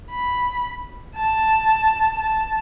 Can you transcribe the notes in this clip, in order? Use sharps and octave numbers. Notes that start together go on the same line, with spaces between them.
B5
A5
A5